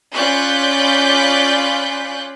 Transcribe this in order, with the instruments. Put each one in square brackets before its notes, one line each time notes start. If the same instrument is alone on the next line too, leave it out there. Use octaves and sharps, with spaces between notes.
[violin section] C#4 F4 D5 B5 F#6 G6